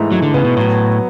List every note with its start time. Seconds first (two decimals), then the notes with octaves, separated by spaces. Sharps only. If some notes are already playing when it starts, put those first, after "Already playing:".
Already playing: G#2 E3 A3
0.12 G#2 F#3
0.22 D3
0.34 C#3 B3
0.45 B2
0.56 A2 F#3